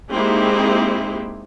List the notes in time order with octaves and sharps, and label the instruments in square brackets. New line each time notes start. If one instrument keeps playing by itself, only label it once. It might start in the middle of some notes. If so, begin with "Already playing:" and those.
[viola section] G#3 A#3 C4 D#4 E4 G4